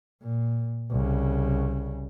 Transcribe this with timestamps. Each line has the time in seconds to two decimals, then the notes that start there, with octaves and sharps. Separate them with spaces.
0.22 A#2
0.91 C2 C#3